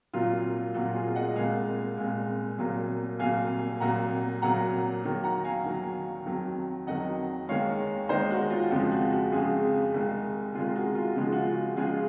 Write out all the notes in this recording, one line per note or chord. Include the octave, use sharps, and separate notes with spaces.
C2 A#2 F#3 F4
C2 A#2 F#3 F#4
F4 G#4
D#5 F#5
C2 A#2 G#3 F5 G#5
C2 A#2 G#3
C2 A#2 F#3
C2 A#2 F#3 F5 G#5
C2 A#2 F#3 F#5 A#5
C2 A#2 F#3 F#5 A#5
D#2 D#3 F#3
F#5 A#5
F5 G#5
D#2 D#3 F#3
F2 D#3 F#3
F2 D#3 F#3 D#5 F#5
D#2 D#3 G#3 C#5 F5
D#2 D#3 G#3 C5 D#5
F#4
F4
F2 C#3 F3 G#3
F#4
F#4
F2 C#3 F3 G#3 F4 G#4
C2 C3 D#3 G#3
C2 C3 D#3 G#3 F4 G#4
F#4
F4
C#2 C#3 F3 G#3 F#4
F#4
F4
C#2 C#3 F3 G#3 F4 G#4